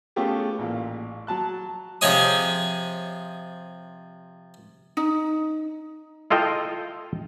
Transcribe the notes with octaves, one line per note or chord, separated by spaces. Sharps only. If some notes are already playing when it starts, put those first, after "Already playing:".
A3 B3 C#4 F4 G4 G#4
A1 A#2 F5
F#3 A5 F#6
C3 F3 G#4 C#5 D#5 D#6
D#4
E4 F4 A4 D#5 G5